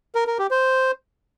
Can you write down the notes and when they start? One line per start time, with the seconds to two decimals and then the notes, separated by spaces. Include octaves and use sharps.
0.15 A#4
0.27 A#4
0.39 G4
0.51 C5